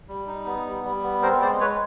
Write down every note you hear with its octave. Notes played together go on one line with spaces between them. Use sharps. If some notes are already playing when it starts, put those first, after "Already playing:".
G3
D#4
B3
G3
G3
B3
C4 A#4 C5
G#3 C5 D5
G#3 B4 C#5